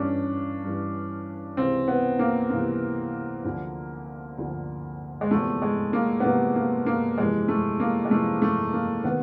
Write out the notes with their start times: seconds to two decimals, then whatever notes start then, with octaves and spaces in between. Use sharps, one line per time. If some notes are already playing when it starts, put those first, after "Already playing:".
Already playing: G2 E3 C#4 D4
0.64 G2 E3
1.57 C#2 C3 E3 C4
1.88 B3
2.19 A#3
2.50 C#2 C3 E3 A#3
3.44 D2 D3 F3
4.38 D2 D3 F3
5.21 G#3
5.31 E2 C3 F3 A3
5.62 G#3
5.93 A#3
6.20 B3
6.24 E2 C3 F3 A#3
6.56 A#3
6.86 A#3
7.18 F2 C3 E3 G#3
7.48 A3
7.80 A#3
8.05 G#3
8.11 F2 C3 E3 A3
8.42 A3
8.73 A#3
9.04 C3 D#3 B3